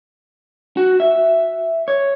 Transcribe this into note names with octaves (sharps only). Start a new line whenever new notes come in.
F#4
E5
C#5